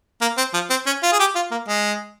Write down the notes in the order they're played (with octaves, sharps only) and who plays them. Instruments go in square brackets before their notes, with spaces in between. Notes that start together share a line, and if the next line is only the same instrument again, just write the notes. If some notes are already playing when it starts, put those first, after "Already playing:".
[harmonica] A#3
C4
F3
C4
C#4
F4
G#4
G4
F4
A#3
G#3